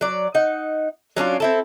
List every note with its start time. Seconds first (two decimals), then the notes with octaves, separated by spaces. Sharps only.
0.01 F#3 D5
0.35 D#4 F#5
1.16 F#3 C#4 D4 F4
1.40 C4 E4 A4